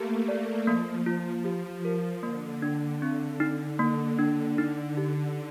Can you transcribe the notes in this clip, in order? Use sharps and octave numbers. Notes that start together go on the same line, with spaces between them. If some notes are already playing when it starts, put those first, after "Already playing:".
Already playing: A3 A#3 G4
D5
F3 A#3
F4
G4
A#4
D3 A#3
D4
C4
D#4
D3 A#3
D4
D#4
G4